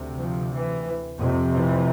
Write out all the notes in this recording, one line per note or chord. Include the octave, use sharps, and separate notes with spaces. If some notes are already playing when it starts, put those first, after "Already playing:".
Already playing: D2 C3
F3
E3
F2 C3
E3